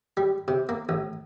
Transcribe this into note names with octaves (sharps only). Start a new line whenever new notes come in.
G3
C3
A#3
A1